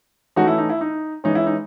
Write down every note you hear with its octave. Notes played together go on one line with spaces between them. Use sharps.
E3 A3 C#4 D#4 F#4
E4
D#4
E4
D#4
E3 G#3 C#4 D#4
E4
D#4